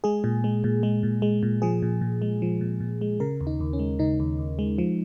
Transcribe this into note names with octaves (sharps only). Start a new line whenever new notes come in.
G#3 G#4
A#2
G#3
A#2
G#3
A#2
G#3
A#2
F3 G#4
A#2
A#2
G#3
F3
A#2
A#2
G#3
C#3 A#4
D#2
D#4
D#2
C#4
G#3
C#3 D#4
D#2
D#2
G#3
F3